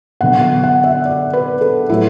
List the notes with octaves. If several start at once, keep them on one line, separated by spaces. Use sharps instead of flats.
D3 F#3 B3 F#5
F#5
F#5
E5
D5
B4
A4
A2 F#3 A3 E4